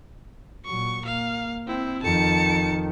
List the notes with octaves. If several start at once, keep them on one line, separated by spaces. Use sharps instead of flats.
A#2 F#3 C#6
A#3 F5
C4 E4
F2 D#3 A5 C#7